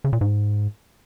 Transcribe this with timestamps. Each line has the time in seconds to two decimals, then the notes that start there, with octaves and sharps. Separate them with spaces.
0.04 C#3
0.13 A#2
0.21 G#2